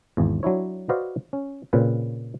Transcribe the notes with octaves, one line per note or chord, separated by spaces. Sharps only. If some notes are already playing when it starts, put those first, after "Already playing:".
G#1 E2
F#3 D4 E4 C#5
F#4 B4 C5 D5 D#5 F5
C#4
A#2 C#3 C4 B4